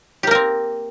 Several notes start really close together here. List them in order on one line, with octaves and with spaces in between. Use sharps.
G4 A#3 A#4 C4